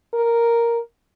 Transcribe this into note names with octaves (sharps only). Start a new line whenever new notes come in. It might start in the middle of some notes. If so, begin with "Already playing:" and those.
A#4